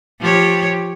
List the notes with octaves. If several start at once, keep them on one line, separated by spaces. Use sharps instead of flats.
F3 G4 C#5